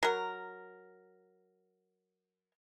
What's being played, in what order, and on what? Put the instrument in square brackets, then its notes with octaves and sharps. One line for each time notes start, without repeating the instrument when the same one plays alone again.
[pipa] F#3 A#4